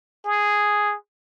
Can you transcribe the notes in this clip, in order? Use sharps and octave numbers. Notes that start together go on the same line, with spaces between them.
G#4